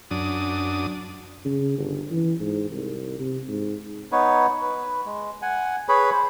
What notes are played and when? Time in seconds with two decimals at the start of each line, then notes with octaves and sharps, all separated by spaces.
0.11 F#2 D4 D#6
1.45 C#3
1.78 G1
2.11 E3
2.40 G#2
2.70 C2
3.19 C3
3.49 G#2
4.12 B3 D#4 B4 C#5
4.62 B4
5.05 G#3
5.42 F#5 G#5
5.89 G#4 B4 C#5 B5
6.12 C5